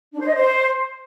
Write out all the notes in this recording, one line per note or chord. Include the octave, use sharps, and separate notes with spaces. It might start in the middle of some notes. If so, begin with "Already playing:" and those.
D4
C5
D#5
C5